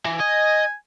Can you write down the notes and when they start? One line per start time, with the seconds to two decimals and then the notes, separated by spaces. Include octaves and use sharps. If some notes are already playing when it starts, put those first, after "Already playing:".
0.05 E3
0.20 D#5 G#5